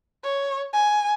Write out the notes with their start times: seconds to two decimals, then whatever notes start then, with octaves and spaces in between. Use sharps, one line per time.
0.23 C#5
0.73 G#5